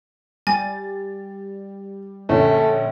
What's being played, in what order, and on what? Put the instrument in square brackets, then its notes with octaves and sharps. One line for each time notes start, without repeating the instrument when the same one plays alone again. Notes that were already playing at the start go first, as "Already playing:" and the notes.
[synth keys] G3 [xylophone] G#5 [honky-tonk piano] A6
[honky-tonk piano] A#1 D3 C#4 [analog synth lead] A3